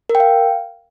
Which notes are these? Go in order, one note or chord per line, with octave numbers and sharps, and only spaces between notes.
A#4
G5
F5